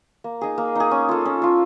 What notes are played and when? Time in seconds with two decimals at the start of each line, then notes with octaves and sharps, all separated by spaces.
0.24 A#3
0.41 D#4 G#4
0.58 A#3
0.75 D#4 G#4
0.91 C#4
1.09 F4 A4
1.25 C#4
1.42 F4 A4